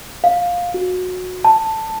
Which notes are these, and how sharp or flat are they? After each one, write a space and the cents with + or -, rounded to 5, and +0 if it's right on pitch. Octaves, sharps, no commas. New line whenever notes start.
F5 +15
F#4 -20
A5 +10